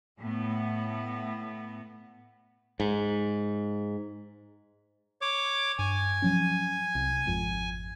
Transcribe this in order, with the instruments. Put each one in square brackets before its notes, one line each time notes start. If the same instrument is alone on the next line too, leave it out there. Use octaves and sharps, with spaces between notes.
[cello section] A2 B3
[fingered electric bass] G#2
[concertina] C#5 D6
[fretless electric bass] G2 [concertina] G#5
[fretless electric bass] F3 F#3 C#4
C2
G#1 F2